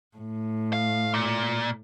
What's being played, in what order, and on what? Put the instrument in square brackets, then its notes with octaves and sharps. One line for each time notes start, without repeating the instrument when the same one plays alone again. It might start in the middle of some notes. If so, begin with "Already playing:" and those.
[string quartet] A2
[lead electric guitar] F5
A#2